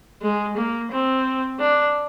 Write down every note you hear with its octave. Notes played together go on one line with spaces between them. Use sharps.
G#3
A#3
C4
D4